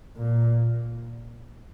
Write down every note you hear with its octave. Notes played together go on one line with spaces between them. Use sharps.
A#2